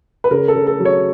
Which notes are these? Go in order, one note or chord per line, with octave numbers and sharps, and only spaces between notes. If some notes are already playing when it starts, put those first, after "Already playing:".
B4
C#3 A#4
A4
C#3
A4
F#3
C#5